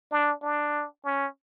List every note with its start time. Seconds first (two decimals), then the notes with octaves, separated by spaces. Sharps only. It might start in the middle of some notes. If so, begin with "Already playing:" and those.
0.11 D4
0.42 D4
1.04 C#4